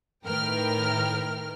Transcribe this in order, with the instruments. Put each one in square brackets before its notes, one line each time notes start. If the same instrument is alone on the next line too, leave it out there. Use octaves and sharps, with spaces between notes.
[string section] A2 D#3 A#4 B4 G5 F6